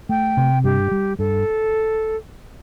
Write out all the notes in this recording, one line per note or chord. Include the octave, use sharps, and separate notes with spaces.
A3 G5
C3
G2 G4
G3
G2 A4